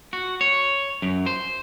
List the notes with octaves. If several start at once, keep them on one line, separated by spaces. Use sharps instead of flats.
F#4
C#5
F#2
C5